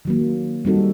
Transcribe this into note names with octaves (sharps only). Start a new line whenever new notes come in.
D#3 F#3 A#3
G3 C4 D#4 F#4 A4